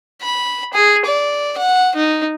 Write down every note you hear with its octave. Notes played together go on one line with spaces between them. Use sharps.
B5
G#4
D5
F#5
D#4